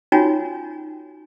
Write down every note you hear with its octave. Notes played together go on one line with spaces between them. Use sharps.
C#4 D#4 F4 F#4 C#5 G#5